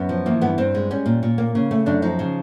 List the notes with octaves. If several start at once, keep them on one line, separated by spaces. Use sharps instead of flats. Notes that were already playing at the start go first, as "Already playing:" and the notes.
Already playing: F#2 B3
F3
E3 A#3
G2 B3
G2 C4
G#3
G3 C#4
A#2
A#2
A#3
C#3
A3
F#2 D4
F3 D#4
C#3